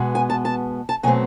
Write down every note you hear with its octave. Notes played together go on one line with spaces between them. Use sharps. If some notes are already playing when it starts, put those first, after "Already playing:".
Already playing: B2 G#3 B3
G#5
A5
A5
A5
B2 F#3 A3 C4 G#5